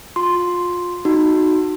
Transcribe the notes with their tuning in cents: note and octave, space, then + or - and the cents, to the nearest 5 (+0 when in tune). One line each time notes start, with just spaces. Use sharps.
F4 +25 C6 +0
D#4 -5 F#4 +0